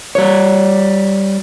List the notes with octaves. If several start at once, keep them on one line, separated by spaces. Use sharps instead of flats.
G3 C#5